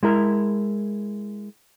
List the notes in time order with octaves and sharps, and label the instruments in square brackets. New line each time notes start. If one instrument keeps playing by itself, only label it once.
[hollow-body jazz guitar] G#3 E4 A#4